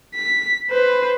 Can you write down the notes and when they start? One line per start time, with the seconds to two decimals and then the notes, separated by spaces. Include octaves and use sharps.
0.15 B6
0.71 B4 C5